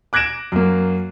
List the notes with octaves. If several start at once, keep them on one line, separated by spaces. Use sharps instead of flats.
D6 F#6 G#6 A#6 D7 E7
F#2 A#3